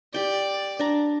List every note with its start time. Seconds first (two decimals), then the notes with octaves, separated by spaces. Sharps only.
0.14 G4 D5 G5
0.79 D4 A#5